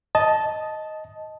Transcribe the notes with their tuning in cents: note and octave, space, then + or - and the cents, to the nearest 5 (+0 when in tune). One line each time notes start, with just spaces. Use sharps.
D#5 +5 A5 -10